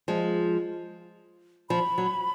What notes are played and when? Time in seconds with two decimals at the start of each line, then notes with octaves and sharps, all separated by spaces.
0.08 F3 G#3
1.70 F3 B5
1.98 F#3